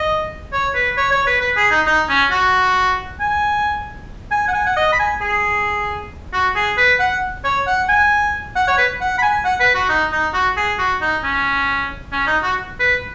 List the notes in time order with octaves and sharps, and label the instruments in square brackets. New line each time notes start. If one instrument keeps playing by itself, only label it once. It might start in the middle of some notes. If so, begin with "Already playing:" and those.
Already playing: [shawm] D#5
C#5
B4
C#5
C#5
B4
B4
G#4
D#4
D#4
C#4
F#4
G#5
G#5
F#5
G#5
F#5
D#5
B5
G#5
G#4
F#4
G#4
B4
F#5
C#5
F#5
G#5
F#5
C#5
B4
F#5
B5
G#5
F#5
B4
F#4
D#4
D#4
F#4
G#4
F#4
D#4
C#4
C#4
D#4
F#4
B4